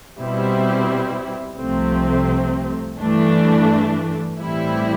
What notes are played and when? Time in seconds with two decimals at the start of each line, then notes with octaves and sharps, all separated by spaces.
0.19 B2 G3 C4 E4
1.59 C2 C3 F3 A3 C4
3.00 G2 E3 A3 D4
4.41 A2 E3 G3 C4 E4